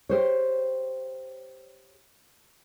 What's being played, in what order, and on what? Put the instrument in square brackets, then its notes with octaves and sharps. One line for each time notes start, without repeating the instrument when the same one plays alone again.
[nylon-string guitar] G4 C5 C#5